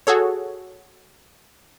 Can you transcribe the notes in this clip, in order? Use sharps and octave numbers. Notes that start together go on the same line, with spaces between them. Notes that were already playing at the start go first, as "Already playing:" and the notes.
F#4 G#4 A4 C#5